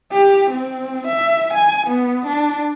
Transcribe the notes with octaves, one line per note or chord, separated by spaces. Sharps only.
G4
C4
E5
G#5
B3
D4